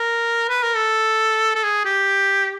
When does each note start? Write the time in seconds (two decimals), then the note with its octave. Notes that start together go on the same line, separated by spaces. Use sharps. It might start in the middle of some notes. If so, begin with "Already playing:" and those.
Already playing: A#4
0.49 B4
0.63 A#4
0.76 A4
1.55 A4
1.64 G#4
1.85 G4